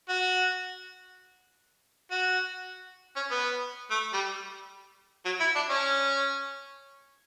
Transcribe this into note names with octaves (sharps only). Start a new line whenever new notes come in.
F#4
F#4
C#4
B3
A3
G3
F#3
E4
D4
C#4